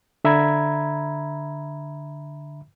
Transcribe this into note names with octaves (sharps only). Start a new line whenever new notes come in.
D3 E5 A#5 B5 G#6